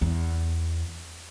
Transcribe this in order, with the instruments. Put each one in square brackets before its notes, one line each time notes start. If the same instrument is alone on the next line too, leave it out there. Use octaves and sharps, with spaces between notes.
[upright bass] E2